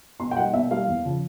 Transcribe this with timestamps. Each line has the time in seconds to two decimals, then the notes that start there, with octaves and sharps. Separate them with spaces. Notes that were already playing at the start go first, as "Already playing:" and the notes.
0.20 B2 C6
0.31 G5
0.36 G3 A#3 D#4 F#5
0.53 B2 E5
0.71 G3 A#3 D#4 F5
0.88 E2
1.05 C#3 F3